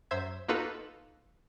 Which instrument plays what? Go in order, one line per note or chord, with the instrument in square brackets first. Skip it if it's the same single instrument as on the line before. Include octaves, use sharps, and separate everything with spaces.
[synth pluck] F#2 C5 E5 G#6
A#3 D#4 F4 F#4 A4 B4